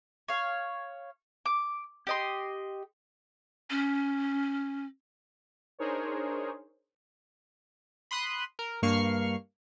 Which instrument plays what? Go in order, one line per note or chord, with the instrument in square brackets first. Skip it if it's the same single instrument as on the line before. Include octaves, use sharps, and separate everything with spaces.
[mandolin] C#5 F5
D6
G4 D#5 C6
[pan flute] C#4
[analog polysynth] D4 D#4 G#4 A#4 C5 C#5
[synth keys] B5 C6 D#6 F#6
A#4
G2 A#3 C#6 F6 C7